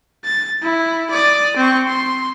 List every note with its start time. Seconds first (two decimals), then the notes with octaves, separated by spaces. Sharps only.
0.24 A6
0.63 E4
1.11 D5 D#6
1.57 C4 C#6
1.87 C6